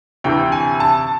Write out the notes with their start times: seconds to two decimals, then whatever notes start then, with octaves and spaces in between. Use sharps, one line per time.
0.24 D2 C3 E3 G5
0.52 G#5
0.80 A5